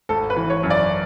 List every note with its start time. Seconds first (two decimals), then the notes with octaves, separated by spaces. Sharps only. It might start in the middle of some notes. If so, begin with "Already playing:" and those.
0.09 G#1 A4
0.30 B4
0.36 E3
0.50 C#5
0.63 F#2
0.70 D5